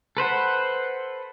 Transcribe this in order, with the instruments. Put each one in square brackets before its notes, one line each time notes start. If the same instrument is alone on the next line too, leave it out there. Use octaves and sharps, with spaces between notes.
[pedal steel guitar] A4 B4 C5 F#5